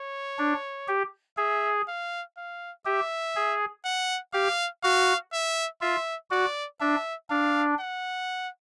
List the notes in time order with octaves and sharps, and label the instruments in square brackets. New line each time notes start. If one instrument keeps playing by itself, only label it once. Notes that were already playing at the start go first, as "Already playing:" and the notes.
Already playing: [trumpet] C#5
[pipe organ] D4
G4
[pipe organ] G#4 [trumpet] E5
[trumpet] F5
F5
[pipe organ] G4 [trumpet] E5
[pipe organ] G#4
[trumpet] F#5
[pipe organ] G4 [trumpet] F5
[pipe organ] F#4 [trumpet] F5
[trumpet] E5
[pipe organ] F4 [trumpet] E5
[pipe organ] F#4 [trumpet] D5
[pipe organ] D4 [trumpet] E5
[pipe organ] D4 [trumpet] F5
[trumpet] F#5